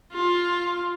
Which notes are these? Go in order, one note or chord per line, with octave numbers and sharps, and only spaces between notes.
F4